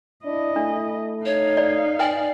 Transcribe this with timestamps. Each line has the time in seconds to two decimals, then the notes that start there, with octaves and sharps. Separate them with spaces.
0.25 D4 E4 D#5
0.56 A3 D4
1.25 D#4 C#5 F5
1.57 D5
1.99 B4 D5 G5 G#5